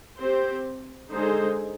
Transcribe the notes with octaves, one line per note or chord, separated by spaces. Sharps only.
C4 G4 C5
D3 G#3 D#4 G#4 C5